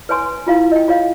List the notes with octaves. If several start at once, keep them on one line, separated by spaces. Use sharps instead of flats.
B4 C#5 G#5 C6
E4 F4 F5
D#5 G5
F4 C#5 F5